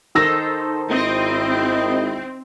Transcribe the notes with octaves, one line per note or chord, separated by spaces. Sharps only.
D#3 D#4 A4 C5 E6 A#6
G#1 C4 D#4 E4 D#5